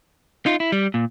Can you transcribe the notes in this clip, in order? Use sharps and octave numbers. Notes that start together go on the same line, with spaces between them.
D#4 F4
E4
G3
A#2